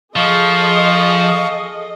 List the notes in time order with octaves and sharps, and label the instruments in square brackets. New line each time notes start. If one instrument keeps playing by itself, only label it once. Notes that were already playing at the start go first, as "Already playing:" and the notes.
[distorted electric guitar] F3 [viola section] G#4 A4 D#5 [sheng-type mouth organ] F5 C#6